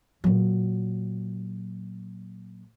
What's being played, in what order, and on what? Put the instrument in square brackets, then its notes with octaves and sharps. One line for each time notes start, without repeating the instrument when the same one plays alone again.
[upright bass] A#2 F#3